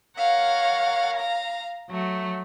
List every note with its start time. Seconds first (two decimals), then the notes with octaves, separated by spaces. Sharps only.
0.18 A#4 C#5 F5 F#5
1.16 F5 A#5
1.90 F#3 A3